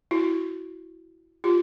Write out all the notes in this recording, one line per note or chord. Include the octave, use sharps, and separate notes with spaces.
E4 F#4
F4 G4